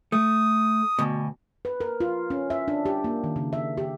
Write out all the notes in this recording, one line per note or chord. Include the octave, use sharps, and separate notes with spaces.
A3 D#6
D2 B2
B4
A#4
F4
C#4
E5
D4
G4
A#3
D#3
C#3
E5
G4